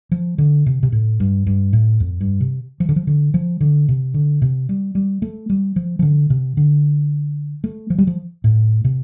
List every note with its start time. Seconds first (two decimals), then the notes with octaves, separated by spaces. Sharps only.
0.11 F3
0.38 D3
0.66 C3
0.83 C3
0.92 A2
1.20 G2
1.47 G2
1.73 A2
2.00 F2
2.21 G2
2.40 C3
2.80 F3
2.89 D3
2.96 F3
3.07 D3
3.34 F3
3.61 D3
3.89 C3
4.14 D3
4.42 C3
4.69 G3
4.95 G3
5.22 A3
5.49 G3
5.76 F3
5.99 F3
6.02 D3
6.30 C3
6.57 D3
7.64 A3
7.90 F3
7.98 G3
8.07 F3
8.44 A2
8.84 C3